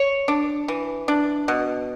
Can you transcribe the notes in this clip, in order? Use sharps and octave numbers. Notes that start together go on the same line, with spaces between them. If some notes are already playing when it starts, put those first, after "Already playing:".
Already playing: C#5
D4
E3
D4
B2